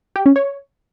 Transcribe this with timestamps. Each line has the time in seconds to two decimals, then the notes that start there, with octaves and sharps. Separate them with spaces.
0.16 G4
0.26 C#4
0.36 C#5